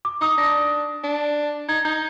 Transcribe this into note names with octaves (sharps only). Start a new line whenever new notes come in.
D6
D#4 D#6
D4 A#6
D4
D#4 G#6
D#4 G6